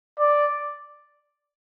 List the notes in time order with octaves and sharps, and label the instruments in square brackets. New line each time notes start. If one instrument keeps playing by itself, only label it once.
[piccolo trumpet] D5